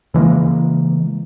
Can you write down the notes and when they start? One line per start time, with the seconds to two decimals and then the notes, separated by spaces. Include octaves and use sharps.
0.14 C#3 E3 G#3 A#3